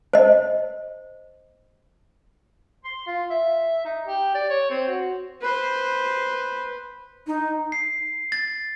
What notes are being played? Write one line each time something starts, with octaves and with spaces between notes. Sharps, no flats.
C5 D#5
C6
F4
E5
D#4
G4
D5
C#5
C4
F#4
B4 C5
D#4
C7
A6